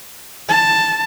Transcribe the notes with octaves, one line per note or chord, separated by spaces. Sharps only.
A5